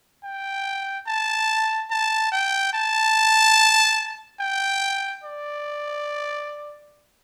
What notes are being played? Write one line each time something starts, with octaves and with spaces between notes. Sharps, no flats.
G5
A5
A5
G5
A5
G5
D5